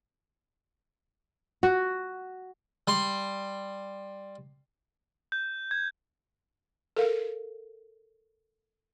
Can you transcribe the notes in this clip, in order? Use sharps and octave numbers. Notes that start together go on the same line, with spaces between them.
F#4
G3 C6
G6
G#6
A4 A#4 F5